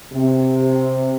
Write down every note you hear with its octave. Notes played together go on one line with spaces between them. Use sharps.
C3